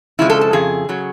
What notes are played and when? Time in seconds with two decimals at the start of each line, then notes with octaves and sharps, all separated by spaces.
0.19 F2 C#3 F3 G#3 E4
0.30 A4
0.41 A4
0.53 F2 C#3 G#4
0.89 C#3 F#3